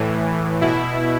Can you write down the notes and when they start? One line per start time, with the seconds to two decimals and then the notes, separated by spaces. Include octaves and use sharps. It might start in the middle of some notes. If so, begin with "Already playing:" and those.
Already playing: A2 E3
0.61 B2 E4